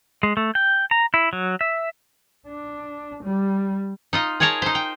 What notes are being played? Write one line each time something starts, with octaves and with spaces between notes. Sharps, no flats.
G#3
A3
G5
A#5
E4
F#3
E5
D4
G3
D#4 F4 D#5
G#4 A#4 C#5 A5 A#5
D#4 C5
G5